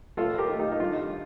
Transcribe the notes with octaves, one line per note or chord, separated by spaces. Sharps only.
A2 F4 A4
G4 A#4
D#4
A3
D#4 G4
D#4
G2 F4